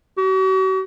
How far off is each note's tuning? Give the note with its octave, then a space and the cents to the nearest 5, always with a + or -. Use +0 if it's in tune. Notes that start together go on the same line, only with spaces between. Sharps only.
F#4 +45